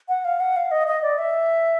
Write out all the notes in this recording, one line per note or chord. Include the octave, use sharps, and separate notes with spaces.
F#5
F5
F#5
F5
D#5
D#5
D5
E5